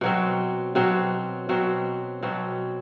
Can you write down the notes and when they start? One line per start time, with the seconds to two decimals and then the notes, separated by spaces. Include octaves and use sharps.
0.01 B2 F#3 C4
0.75 B2 F#3 C4
1.49 B2 F#3 C4
2.23 B2 F#3 C4